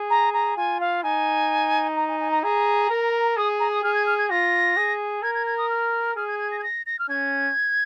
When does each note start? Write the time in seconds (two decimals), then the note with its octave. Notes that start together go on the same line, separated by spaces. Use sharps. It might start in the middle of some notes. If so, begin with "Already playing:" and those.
Already playing: G#4
0.10 A#5
0.34 A#5
0.57 F4 G#5
0.80 F5
1.03 D#4 G#5
1.96 A#5
2.08 G#5
2.20 G#5
2.31 A#5
2.43 G#4 A#5
2.90 A#4
3.36 G#4 D#6
3.60 A#5
3.71 D#6
3.83 G#4 F6
3.94 G#6
4.06 F6
4.18 G#6
4.30 F4 A#6
4.77 G#4
5.22 A#4 G#6
5.34 G#6
5.46 G#6
5.58 D#6
5.70 F6
6.16 G#4 F6
6.28 G#6
6.39 G#6
6.51 A#6
6.59 G#6
6.63 A#6
6.86 A#6
6.99 F6
7.09 C#4 G#6